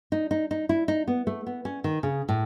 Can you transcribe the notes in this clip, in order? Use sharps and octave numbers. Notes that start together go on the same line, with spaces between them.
D#4
D#4
D#4
E4
D#4
B3
A3
B3
C#4
D#3
C#3
A2